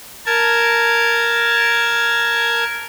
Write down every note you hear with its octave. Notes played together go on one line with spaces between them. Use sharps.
A#4 A5 G#6